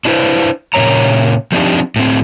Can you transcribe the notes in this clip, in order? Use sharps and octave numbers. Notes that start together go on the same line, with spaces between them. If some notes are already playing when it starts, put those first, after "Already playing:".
D4 E4 G#4 A4 B4 C5
A#2 C#3 A#3 C#5 A#5
F3 A3 C4 D4 D#4 G4
A2 C4